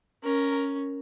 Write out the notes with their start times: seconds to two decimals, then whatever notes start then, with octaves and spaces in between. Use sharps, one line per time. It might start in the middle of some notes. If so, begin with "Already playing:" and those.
0.24 C#4 A#4